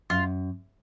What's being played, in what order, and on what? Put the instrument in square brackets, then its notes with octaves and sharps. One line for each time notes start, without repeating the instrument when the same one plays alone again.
[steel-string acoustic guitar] F#2 [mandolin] F4